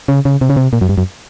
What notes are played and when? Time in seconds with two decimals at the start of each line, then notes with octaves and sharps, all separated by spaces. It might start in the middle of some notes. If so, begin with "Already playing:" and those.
0.08 C#3
0.25 C#3
0.41 C3
0.50 C#3
0.57 C3
0.73 A#2
0.81 F#2
0.89 G2
0.98 F#2